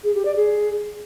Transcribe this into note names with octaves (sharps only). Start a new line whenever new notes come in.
G#4
G4
D5
G#4